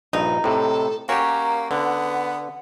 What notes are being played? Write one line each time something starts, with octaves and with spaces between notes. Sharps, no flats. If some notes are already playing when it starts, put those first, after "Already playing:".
A#1 G2 D#4
A2 C3 A4
A#3 C#4 F#4 G4 A#5
D3 B3 F#5